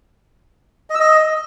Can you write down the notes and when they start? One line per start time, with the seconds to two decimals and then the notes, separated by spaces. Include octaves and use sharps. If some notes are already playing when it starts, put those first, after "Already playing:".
0.90 D#5
0.95 E6
1.00 D#5